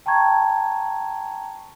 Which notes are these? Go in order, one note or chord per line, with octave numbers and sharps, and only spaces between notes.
G5 A5 A#5 C#6 G#6